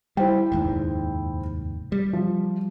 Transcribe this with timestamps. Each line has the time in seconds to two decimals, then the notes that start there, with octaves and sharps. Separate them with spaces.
0.17 G3 E4 C5 G5
0.52 F1 D#2 G#2
1.92 G3
2.13 F3